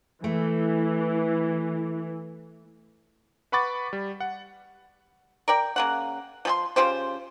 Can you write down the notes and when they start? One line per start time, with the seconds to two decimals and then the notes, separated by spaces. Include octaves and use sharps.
0.24 E3 A3
3.52 B4 F#5 B5 C#6 D6 A6
3.93 G3
4.20 F#5
5.48 A#4 D5 G5
5.76 C#3 A#3 F#5
6.45 F3 G#4 C6
6.76 C#3 F4 G4 C5